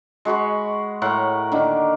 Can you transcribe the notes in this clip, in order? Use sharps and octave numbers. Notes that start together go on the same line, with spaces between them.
G#3 F#4 B5 C#6
A2 E4 A#4 F#5
D3 D#3 A#3